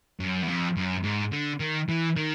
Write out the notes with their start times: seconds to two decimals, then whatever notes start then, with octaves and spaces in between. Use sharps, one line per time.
0.20 F#2
0.42 E2
0.48 F2
0.76 F#2
1.04 G#2
1.32 D3
1.60 D#3
1.89 E3
2.17 D#3